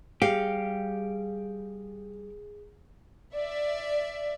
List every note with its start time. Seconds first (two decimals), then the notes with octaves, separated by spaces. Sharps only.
0.22 G3 G4 G#4 F5
3.36 D5 E5